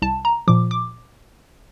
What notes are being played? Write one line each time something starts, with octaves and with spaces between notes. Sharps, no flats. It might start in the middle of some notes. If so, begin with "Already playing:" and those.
C2 A5
A#5
A#2 F3 D6
D6